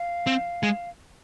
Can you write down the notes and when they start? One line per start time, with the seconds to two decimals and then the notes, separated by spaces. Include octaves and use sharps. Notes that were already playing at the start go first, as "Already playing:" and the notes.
Already playing: F5
0.27 C4
0.63 G#3